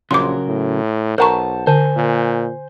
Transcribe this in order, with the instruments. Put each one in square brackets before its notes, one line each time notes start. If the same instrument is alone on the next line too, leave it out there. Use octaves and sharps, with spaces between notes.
[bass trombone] A#1 [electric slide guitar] C#3 F#3 A#4 [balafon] C6 D6
[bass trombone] A2
[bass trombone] B1 [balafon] A#4 A#5 C#6 [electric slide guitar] C5 F#5 A5
[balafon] D3 [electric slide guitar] C5 G#5
[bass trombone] A#2